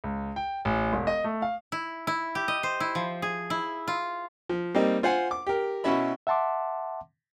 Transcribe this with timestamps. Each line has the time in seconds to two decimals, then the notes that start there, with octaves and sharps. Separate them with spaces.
0.04 C#2
0.36 G5
0.65 A1
0.93 E1
1.07 D#5
1.24 A3
1.42 F5
1.72 E4
2.07 E4
2.35 G4
2.48 D#5
2.63 C5
2.80 E4
2.95 F3
3.22 G#4
3.50 E4
3.88 F4
4.49 F3
4.75 G3 A#3 C4 D#4
5.03 F4 C5 F#5 G#5
5.31 D6
5.47 G4 A#4
5.84 B2 C#4 E4 E5 B5
6.27 E5 F#5 A5 C6 D6